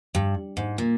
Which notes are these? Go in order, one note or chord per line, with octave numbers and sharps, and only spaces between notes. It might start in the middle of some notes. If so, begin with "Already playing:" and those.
G2
G#2
A#2